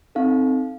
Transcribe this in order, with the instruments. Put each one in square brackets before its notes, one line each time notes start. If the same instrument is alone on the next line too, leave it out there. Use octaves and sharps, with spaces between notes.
[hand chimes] C4 D#4 A4 F5